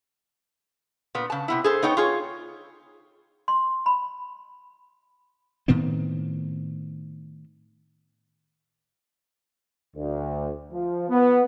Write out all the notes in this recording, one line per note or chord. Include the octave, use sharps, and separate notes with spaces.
A#2 B3
C#3 A5
C3 B3 E4
G#4 A4 C5
B3 D#4 C#5 G5
F4 G#4 C#5
C6
B5
A2 D#3 B3 C4
D2
F3
B3